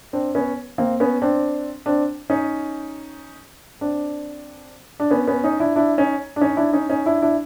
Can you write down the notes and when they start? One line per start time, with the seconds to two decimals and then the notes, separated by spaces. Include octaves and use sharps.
0.13 C4 D4
0.35 B3 C#4
0.78 A#3 C4
1.00 B3 C#4
1.22 C4 D4
1.86 C4 D4
2.30 C#4 D#4
3.81 C4 D4
5.00 D4
5.11 B3 C#4
5.27 B3 C#4
5.44 C#4 D#4
5.60 D4 E4
5.76 D4 E4
5.98 C#4 D#4
6.36 D4
6.41 C#4 D#4
6.57 D4 E4
6.73 C#4 D#4
6.90 C#4 D#4
7.06 D4 E4
7.22 D4 E4